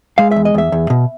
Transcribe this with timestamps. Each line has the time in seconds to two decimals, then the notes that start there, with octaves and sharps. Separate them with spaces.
0.18 G#3 F5
0.31 E5
0.36 E2
0.45 D#5
0.54 E2 E5
0.72 E2
0.90 B2